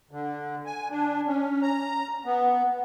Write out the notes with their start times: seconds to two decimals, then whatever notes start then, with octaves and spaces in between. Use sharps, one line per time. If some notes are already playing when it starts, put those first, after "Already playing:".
0.11 D3
0.66 G#5
0.91 D4
1.26 C#4
1.62 A#5
2.25 B3